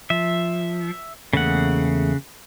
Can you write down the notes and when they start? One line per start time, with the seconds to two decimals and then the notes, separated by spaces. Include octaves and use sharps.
0.10 F3 E5
1.33 E2 C#3 A3 A#3 F#5